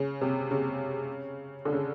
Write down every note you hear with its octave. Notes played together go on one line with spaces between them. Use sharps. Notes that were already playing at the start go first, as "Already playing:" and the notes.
Already playing: C#3
C3
C#3
D3
C#3